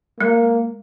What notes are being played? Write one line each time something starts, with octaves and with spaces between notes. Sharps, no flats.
G#3 A#3